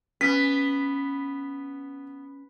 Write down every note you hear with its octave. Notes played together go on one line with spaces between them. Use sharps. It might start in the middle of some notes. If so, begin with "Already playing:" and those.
B3 C#4 B6